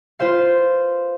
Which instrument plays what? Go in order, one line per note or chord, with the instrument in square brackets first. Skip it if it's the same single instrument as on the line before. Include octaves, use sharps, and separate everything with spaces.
[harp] F4 B4 C5 F5